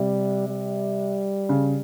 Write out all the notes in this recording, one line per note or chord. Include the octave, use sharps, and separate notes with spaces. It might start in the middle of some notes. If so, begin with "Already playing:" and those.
Already playing: C3 G3
G3
C#3